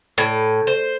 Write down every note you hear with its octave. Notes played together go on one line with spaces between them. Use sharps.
A2
C5